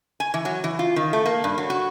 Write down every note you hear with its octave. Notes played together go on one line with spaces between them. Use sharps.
G#5
E3
F#3
E3
F4
D#3
A3
A#3
G2
F#3
F#4